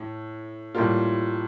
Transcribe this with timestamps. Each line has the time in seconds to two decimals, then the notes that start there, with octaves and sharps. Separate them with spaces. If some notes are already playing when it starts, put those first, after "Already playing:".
Already playing: A2
0.75 A2 G3 A#3 F4